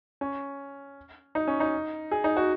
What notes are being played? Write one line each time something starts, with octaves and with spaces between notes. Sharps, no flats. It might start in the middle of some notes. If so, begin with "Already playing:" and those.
C#4
D#4
C#4
D#4
G#4
D#4
F#4